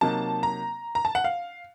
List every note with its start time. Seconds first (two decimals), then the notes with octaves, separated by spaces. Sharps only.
0.01 C3 F#3 A#3 D#4 A5
0.43 A#5
0.95 A#5
1.05 A5
1.15 F#5
1.24 F5